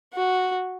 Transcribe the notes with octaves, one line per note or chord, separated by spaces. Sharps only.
F#4